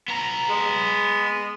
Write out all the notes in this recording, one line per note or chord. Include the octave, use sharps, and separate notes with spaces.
B3 A#5
G#3